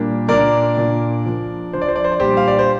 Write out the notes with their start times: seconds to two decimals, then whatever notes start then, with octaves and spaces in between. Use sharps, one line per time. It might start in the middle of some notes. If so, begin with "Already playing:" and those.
Already playing: A#2 G3 A#3 D4 G4
0.29 A#2 A#3 D4 A#4 D5
0.78 A#2 A#3 D4
1.25 F3 D4
1.73 F3 D4 C5
1.82 D5
1.88 C5
1.96 D5
2.04 C5
2.11 D5
2.20 A#2 G3 D4 G4 C5
2.37 F5
2.48 D5
2.59 C5